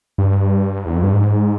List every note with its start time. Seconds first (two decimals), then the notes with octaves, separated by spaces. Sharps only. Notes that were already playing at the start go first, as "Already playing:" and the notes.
0.18 G2
0.86 E2
0.96 F2
1.03 G2
1.13 G#2